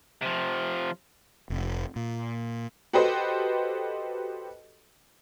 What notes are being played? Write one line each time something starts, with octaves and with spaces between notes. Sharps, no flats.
C3 F3
F1
A#2
F#4 G4 A4 B4 C5 D#5